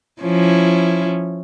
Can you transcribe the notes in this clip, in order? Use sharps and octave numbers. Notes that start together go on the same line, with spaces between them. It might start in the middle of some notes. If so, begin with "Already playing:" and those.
F3 C#4 E4